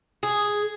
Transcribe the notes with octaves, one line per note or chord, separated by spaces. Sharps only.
G#4